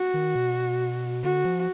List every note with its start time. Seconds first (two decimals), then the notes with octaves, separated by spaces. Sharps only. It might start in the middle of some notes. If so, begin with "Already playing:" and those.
Already playing: F#4
0.14 D#3
0.35 B2
1.23 D3 F#4
1.45 F3